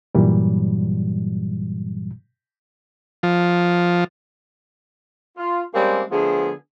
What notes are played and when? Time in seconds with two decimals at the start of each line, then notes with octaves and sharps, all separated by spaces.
0.15 G2 A#2 E3 F#3 G3
3.23 F3
5.37 F4
5.73 G3 G#3 A#3 C4 C#4 G4
6.11 D3 F3 A3 B3 G#4